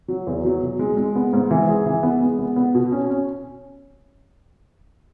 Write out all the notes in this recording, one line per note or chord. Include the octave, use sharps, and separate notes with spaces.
F#3
E2
F#3
B2
G#3
G#3
B3
G#2
E3
G#4
E3
B3
G#3
B3
B3
B2
C#4
C#4